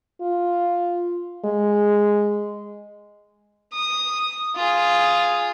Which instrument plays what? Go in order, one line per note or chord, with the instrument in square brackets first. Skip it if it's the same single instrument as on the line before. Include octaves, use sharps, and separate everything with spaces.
[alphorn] F4
G#3
[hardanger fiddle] D#6
F4 G#4